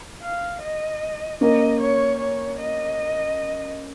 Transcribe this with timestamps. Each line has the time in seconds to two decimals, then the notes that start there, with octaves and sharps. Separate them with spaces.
0.22 F5
0.62 D#5
1.41 A#3 C#4 D#5
1.81 C#5
2.20 C#5
2.60 D#5